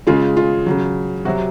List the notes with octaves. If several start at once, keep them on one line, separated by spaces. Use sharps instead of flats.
C#3 G#3 F4
F4
C#3 F#3
C3 F#3 F#4